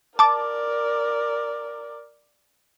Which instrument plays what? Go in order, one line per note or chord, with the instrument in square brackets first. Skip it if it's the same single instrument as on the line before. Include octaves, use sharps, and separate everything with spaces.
[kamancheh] A#4 D5 [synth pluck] A5 D6